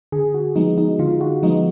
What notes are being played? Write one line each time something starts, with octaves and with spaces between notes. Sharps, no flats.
D3 G#4
F#4
F3 G#3 B3 D#4
D#4
D3 F4
F#4
F3 G#3 B3 D#4